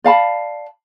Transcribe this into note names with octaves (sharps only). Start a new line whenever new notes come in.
D5 F5 A5 B5